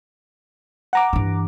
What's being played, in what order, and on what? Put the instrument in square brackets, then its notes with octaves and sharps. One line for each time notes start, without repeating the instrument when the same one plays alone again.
[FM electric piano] F#5 A#5 D6
[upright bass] G2 E3